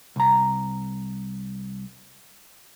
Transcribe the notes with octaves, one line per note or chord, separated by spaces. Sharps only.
C2 A#5